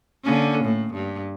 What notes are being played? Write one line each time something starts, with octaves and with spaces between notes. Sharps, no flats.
D3 A#3 C#4
A2
G2